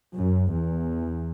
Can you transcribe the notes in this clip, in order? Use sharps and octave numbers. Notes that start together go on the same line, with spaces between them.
F#2
E2